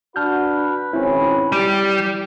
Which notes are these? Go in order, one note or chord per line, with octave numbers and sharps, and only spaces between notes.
D4 F#4 B4 A5 F6 G6
G#1 C4 C#4 E4
G3 G4